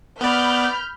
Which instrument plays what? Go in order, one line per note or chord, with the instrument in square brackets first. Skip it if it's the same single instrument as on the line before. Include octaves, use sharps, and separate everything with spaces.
[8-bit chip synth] B3 D5 [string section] B5 F6 G6